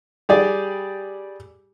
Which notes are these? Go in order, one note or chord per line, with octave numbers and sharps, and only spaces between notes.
G3 G4 G#4 D5